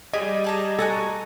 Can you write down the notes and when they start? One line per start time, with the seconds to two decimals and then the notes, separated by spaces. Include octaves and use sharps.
0.13 G3 G4 G#4 D#5
0.44 G#4 A5 A#5
0.79 F#4 A4 G#5 A#5